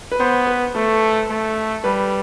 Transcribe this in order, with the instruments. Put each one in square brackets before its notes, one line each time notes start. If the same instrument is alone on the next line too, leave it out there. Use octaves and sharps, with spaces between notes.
[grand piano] B4
[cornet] B3 [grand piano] C5
[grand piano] B4
[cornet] A3 [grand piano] A4
[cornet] A3
[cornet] G3 [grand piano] B4